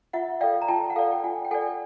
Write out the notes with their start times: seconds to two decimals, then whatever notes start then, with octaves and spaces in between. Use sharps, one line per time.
0.13 F4 E5 F#5
0.41 A4 D5 F5 G5
0.62 A#5
0.68 F4 G5 A5
0.90 F#5
0.96 A4 D5 F5 G5
1.12 G5
1.24 F4 F#5 G#5
1.45 G5
1.51 A4 D5 F#5 G#5